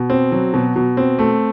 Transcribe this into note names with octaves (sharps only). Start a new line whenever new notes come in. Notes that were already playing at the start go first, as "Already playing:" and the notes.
Already playing: B2
C4
F#3
B2
B2
C4
A3